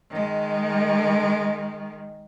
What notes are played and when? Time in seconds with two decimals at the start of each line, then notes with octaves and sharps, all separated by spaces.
0.11 D#3 G#3